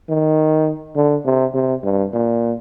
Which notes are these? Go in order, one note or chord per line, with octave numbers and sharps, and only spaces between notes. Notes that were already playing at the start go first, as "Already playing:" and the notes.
D#3
D3
C3
C3
G2
A#2